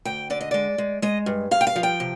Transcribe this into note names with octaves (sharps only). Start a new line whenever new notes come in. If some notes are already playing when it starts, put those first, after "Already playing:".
D2 G5
D3 D5
D#5
G#3 D5
G#3
G#3 D#5
G2
G2 F5
G5
F5
F3
G5
C3